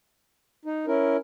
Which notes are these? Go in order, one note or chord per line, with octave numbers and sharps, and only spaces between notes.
D#4
C#4 E4 A#4